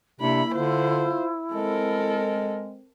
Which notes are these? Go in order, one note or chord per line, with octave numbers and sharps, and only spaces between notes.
C3 A#3 D4 E4 B5
D3 F4 C5
G#3 C4 A4 A#4